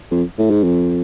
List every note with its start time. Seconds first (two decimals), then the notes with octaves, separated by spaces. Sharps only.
0.11 F2
0.38 A2
0.50 G#2
0.64 F2